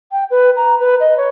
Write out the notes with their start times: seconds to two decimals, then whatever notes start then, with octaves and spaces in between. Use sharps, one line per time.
0.12 G5
0.31 B4
0.56 A#5
0.80 B4
1.00 D#5
1.17 C#5